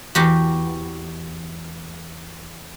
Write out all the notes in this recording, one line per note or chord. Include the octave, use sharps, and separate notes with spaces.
E2 F#4 G4